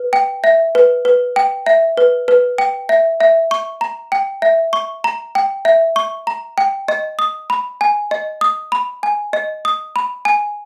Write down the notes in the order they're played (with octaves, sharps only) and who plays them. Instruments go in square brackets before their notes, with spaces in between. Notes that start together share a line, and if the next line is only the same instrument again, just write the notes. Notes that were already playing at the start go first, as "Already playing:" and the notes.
Already playing: [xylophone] B4
G5
E5
B4
B4
G5
E5
B4
B4
G5
E5
E5
C#6
A#5
G5
E5
C#6
A#5
G5
E5
C#6
A#5
G5
D#5
D#6
B5
G#5
D#5
D#6
B5
G#5
D#5
D#6
B5
G#5